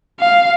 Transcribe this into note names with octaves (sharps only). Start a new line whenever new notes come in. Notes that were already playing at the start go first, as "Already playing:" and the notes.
F5